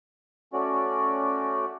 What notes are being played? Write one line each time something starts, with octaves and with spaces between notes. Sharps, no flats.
A3 C#4 F#4 D5